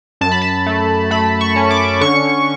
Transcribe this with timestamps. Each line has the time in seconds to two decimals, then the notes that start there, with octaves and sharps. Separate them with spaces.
0.21 F#2 A5
0.32 B5
0.42 A5
0.66 A3
1.11 A3 B5
1.41 C#6
1.56 C#4
1.71 D6
2.01 D3 C#6